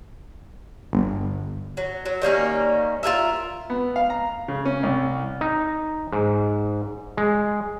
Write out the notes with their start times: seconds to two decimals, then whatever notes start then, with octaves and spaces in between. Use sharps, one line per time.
0.93 G1
1.77 F#3
2.06 F#3
2.22 D#3 G3 A#3 C#4
3.03 F4 G#4 A#4 E5
3.70 B3
3.96 F5
4.10 A#5
4.48 C#3
4.65 C#4
4.83 C2
5.41 D#4
6.12 G#2
7.17 G#3